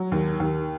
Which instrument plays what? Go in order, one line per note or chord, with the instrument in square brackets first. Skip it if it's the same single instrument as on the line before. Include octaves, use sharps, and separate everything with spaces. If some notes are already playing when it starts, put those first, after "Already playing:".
Already playing: [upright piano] F#3
D#2
D#2